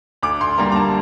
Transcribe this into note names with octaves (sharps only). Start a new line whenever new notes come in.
D2 D6
C6
D3 G3 A#3 A#5
A#5
A5